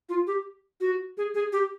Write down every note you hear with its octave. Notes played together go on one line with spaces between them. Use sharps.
F4
G4
F#4
G#4
G#4
G4